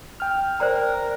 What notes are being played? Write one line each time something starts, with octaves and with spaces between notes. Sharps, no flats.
G5 F6
A#4 C5 D5 A#5